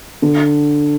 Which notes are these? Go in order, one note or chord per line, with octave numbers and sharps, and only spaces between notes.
D3